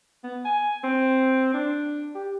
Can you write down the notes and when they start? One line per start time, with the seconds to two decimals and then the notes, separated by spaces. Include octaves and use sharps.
0.24 B3
0.45 G#5
0.84 C4
1.54 D4
2.15 G4